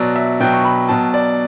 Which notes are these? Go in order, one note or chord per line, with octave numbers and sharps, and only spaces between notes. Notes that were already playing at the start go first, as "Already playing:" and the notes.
Already playing: B2 F#3 D5
E5
B2 F#3 G5
C#6
B5
B2 F#3 A5
D5